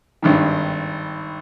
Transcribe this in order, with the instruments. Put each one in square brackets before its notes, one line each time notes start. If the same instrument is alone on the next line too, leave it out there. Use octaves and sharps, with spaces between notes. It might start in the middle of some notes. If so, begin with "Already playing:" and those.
[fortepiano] G#1 G2 D#3